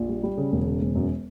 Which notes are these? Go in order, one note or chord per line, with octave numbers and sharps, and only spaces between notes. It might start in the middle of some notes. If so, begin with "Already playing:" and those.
Already playing: A#1
G3
G3
C#3
E1
C#3
E1
F#2